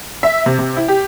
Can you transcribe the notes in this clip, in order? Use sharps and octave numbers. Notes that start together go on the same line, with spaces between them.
E5
C3
C3
E4
G4